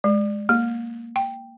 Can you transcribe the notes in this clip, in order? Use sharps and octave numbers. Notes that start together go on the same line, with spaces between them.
G#3
A#3
G5